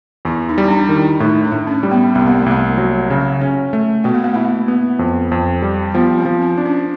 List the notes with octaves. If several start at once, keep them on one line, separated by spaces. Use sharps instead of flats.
E2 E4
D#4
G3
D4
D#4
D#3
E4
A2 D#4
D4
A2
C#4
G3
B3
C2 B3
A#3
A3
C2 A#3
F#3
C#3
C#4
A3
B2 B3
A#3
A3
A#3 E4
B3
F2
F2
G3
F3 B3
C4
F3
C4
D4
C#4